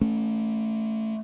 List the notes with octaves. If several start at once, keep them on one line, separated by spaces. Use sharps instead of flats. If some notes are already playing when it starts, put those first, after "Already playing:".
A3 C#4